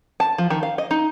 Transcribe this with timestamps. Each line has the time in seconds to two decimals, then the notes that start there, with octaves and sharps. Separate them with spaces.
0.20 A5
0.38 F3
0.50 D#3
0.63 F5
0.78 D#5
0.91 D#4